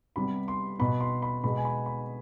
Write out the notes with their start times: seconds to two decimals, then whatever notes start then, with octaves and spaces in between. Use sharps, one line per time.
0.16 C3 G3 B3 B5
0.48 C6
0.79 B2 B3 B5
1.00 C6
1.22 B5
1.44 B2 G#3 B3 B5
1.57 G#5
1.65 B5
1.86 B5